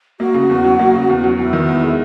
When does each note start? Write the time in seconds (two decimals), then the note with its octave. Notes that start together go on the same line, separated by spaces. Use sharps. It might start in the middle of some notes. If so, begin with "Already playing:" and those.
0.19 A#3 F#4
0.34 C#3
0.50 E2
0.64 F#3
0.79 A#3
0.94 C#3
1.09 E2
1.24 F#3
1.38 E2 E4
1.53 D#3
1.69 E2
1.83 G#3